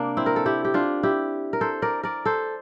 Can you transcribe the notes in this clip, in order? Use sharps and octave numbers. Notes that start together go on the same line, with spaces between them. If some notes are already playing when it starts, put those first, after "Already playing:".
Already playing: C3 A#3 D4
C4 E4
A#4
A4
E4 G4
G4
D4 F4
E4 G4
A#4
A4 C5
A#4 D5
A#4 D5
A4 C5